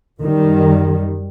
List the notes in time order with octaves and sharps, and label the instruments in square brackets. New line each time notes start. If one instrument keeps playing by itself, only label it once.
[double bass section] F#2 D#3 G3